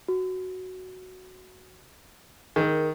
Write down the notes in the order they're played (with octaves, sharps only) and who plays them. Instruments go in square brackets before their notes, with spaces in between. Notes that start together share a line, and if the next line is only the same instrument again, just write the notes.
[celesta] F#4
[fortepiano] D#3 [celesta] G#4 A#4